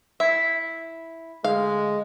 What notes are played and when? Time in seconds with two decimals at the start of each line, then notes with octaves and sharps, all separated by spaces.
0.20 E4 E5
1.44 D2 G#3 F5